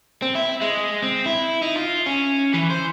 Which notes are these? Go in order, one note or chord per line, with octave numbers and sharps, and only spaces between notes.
C4
E4
G#3
C4
E4
D#4
F4
C#4
E3
C5